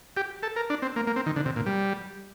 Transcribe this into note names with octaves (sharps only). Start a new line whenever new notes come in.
G4
A4
A#4
D4
C4
A#3
A#3
C4
D#3
D3
C3
A#2
G3